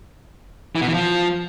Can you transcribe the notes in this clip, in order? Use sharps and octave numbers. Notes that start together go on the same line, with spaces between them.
E3
B2
E3
F3